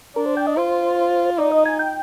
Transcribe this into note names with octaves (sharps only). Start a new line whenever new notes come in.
D4 A#4
C5
G5
D#5
F4 C5
D#4 D5
D#5
G#5
G5